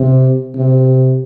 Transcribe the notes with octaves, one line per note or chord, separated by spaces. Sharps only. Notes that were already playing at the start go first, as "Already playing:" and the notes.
Already playing: C3
C3